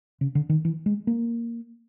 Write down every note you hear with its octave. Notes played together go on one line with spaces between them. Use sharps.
C#3
D3
D#3
E3
G#3
A#3